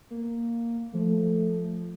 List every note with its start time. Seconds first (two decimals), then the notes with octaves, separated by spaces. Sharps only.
0.10 A#3
0.94 F3 A3